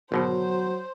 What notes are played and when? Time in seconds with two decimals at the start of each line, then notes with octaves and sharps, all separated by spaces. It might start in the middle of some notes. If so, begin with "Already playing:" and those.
0.12 G#1 B2 D3 F#3 C5